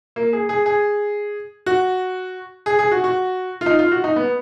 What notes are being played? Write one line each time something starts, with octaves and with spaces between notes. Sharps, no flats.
A#3
G#4
G#4
G#4
F#4
G#4
G#4
F#4
F#4
F4
D#4
F4
F#4
D#4
B3